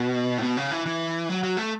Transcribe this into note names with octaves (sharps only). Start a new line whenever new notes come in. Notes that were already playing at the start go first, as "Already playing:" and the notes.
Already playing: B2
A2
B2
C#3
E3
E3
F#3
F#3
A3